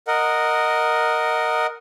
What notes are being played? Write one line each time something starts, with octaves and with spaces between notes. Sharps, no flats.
A#4 D#5 F#5